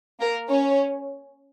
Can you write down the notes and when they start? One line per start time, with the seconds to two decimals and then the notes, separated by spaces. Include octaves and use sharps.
0.20 A#3 A#4
0.49 C#4 C#5